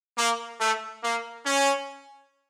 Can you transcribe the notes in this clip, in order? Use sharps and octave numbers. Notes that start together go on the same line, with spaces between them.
A#3
A3
A#3
C#4